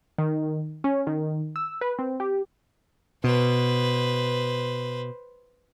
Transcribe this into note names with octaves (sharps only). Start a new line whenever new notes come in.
D#3
C#4
D#3
E6
B4
C4
G4
B2 B4 C5